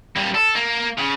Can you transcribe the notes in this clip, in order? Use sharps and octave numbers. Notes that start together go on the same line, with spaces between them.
G3 A#3
A4
A#3
C#3